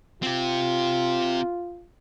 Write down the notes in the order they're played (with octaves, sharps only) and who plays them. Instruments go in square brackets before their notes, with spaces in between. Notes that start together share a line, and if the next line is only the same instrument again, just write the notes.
[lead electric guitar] C4 G4 [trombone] F4